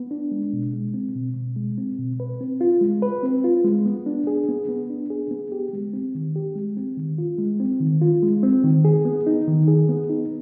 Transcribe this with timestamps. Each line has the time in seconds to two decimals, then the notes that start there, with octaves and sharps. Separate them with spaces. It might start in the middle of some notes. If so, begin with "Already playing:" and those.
Already playing: B3
0.11 D4
0.31 G#3
0.53 B2
0.74 G#3
0.94 C4
1.15 B2
1.36 B2
1.56 G#3
1.78 C4
1.99 B2
2.20 B4
2.41 C4
2.61 F4
2.81 G#3
3.02 B4
3.23 C4
3.44 F4
3.64 G#3
3.86 B3
4.06 D4
4.27 G#4
4.49 B3
4.69 B3
4.90 D4
5.10 G#4
5.31 B3
5.52 G4
5.73 G#3
5.93 C4
6.15 D#3
6.36 G4
6.55 G#3
6.77 C4
6.97 D#3
7.18 F4
7.39 G#3
7.60 C4
7.81 D#3
8.02 F4
8.23 G#3
8.43 C4
8.64 D#3
8.85 G#4
9.05 B3
9.27 D#4
9.48 D#3
9.68 G#4
9.89 B3
10.10 D#4